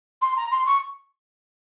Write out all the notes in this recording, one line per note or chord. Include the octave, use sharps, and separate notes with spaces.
C6
A#5
C6
C#6